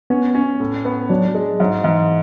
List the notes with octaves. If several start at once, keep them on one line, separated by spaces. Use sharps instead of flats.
B3 C#4
C#4
A2
B3
F#3 D4
G#3
G#2 F#3
G#2 E3